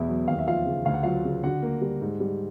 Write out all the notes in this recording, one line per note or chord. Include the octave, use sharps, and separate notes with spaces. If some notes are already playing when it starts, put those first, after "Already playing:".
Already playing: E2 B2 E4 E5
F#3
D#2 F5
E5
F3 F4 F5
C#3
D2 F5
F#5
F#3 F4 F5
C#3
D3 F#4 F#5
A#3
G3
G#2
G3